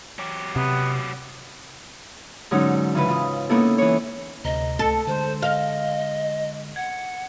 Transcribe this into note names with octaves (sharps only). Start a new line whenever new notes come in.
F#3 G4
C3 B3
G#2 D3 F#3 C#4 D#4
C#3 E3 C#4 B4
F4 D#5
A#3 B3 C#4 D#4 E4 A4
E3 C#5
D2 C3 D#5 A#5
C#2 A3 A4 C#7
D3 G#3 C5 C6
D#5 F5
F#5 G#6